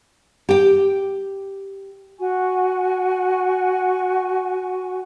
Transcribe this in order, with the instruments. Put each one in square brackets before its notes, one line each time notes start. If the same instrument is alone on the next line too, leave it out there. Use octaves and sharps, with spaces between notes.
[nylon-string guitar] G4 G5
[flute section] F#4 G#5 C#6